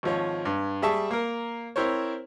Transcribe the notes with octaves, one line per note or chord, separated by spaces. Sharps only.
G#1 F3 C#5
G2
G3 G#4 E5 A5 C#6
A#3 A#4
C4 E4 A#4 C5 C#5